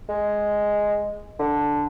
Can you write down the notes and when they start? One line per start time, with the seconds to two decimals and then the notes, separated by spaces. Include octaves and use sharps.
0.09 G#3
1.39 D3